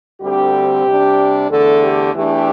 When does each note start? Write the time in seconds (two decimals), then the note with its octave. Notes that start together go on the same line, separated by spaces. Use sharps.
0.21 D2 D3 G3 C4 G4
0.85 C3 G3 D4
1.50 E2 D3 A3 A4
1.82 G4
2.14 E2 E3 A3 D4 G4